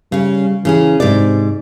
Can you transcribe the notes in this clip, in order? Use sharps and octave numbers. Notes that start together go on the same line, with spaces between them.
C#3 G3 C#4
C#3 E3 C#4 G#4
G#2 C3 D5